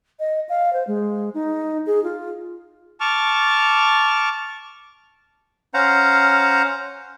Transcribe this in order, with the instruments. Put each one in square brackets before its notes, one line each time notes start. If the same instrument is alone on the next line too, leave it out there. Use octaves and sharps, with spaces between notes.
[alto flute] D#5
F5
C5
G#3
D#4
G#4
F4
[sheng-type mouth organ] A5 C#6 D6 F6
[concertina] C#4 C5 F5 F#5 A#5